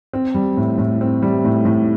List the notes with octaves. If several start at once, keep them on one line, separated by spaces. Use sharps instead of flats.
C4
G3
A2
A2
C4
G3
A2
A2